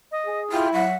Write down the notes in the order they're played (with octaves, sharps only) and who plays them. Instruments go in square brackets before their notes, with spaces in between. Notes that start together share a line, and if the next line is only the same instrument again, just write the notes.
[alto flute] D#5
[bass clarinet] G#4
[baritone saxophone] E4 [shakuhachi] F4 [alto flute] G4
[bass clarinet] F#3 [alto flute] E5 [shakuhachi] F#5